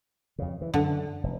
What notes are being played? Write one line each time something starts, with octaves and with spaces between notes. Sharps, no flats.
F2 C#3
E3
F#2 D3
F1